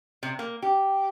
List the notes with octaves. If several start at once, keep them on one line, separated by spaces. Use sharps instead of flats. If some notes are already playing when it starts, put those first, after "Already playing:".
C3
A#3
G4